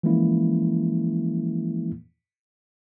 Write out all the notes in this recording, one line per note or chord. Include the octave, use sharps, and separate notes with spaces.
E3 F3 G#3 A#3 C#4 E4